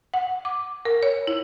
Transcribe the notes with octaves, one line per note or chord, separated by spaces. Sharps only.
F#5
D6
A#4
C#5
E4